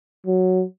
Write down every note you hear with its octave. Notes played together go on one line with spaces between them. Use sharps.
F#3